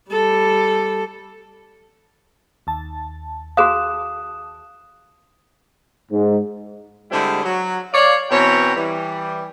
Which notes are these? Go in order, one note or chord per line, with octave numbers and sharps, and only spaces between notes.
G3 A4
D#2 A5
F#4 G#4 F5 D#6 F#6 E7
G#2
D3 G3 G#3 C4 E4 G#4
F#3
C#5 D5 F5
B2 E3 C4 C#5 G5 A#5
E3 G3